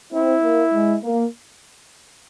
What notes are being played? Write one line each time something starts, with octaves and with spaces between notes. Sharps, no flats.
C4 E4
A#3
G#3
A#3